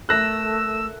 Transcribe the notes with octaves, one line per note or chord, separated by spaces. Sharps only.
A3 A4 A#4 E5 E6 F#6 A#6